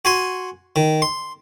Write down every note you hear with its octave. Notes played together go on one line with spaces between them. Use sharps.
F#4 G#5 C6
D#3
C6